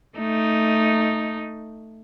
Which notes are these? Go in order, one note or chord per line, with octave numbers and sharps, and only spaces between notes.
A3 D#4